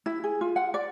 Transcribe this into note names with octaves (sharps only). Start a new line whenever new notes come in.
E4
G#4
F4
F#5
D5